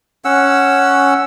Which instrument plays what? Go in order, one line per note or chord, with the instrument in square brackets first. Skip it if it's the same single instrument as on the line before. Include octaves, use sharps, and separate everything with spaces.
[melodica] C#4 F#5 E6